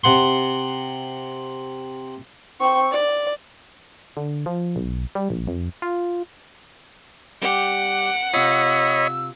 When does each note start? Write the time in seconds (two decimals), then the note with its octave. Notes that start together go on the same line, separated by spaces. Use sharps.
0.04 C3 F#5 C6
2.60 C4 C#6
2.91 D5
4.17 D3
4.46 F3
4.76 B1
5.15 G3
5.30 A#1
5.48 F2
5.82 F4
7.42 G3 G4 F#5 D7
8.34 C3 F4 C#5 D#5 B5 E6